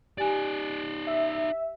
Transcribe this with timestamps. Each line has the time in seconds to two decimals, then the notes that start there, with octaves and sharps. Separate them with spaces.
0.18 D#4 G4 D5 G#5
1.07 E5